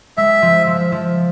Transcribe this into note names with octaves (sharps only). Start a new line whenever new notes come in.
G#3 E5
F3
F3
F3